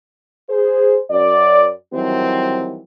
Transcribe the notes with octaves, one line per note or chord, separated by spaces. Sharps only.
G#4 C5
F#2 D5
D#3 E3 F#3 G3 C4